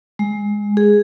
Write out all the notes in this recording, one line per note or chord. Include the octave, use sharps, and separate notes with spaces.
G#3
G#4